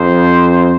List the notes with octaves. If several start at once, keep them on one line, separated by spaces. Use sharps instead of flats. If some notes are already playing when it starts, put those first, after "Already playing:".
Already playing: F2 C5